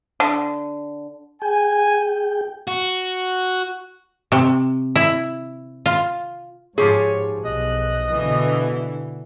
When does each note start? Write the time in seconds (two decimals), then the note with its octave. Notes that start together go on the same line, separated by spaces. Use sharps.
0.20 D3
1.42 G#4 G5 G#5
2.68 F#4
4.32 C3
4.96 E4
5.86 F4
6.78 G#2 F3 G4 G#4 C#5
7.45 B1 D#5 F#6
8.11 B2 D3 E3